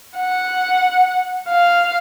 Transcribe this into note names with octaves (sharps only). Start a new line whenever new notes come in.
F#5
F5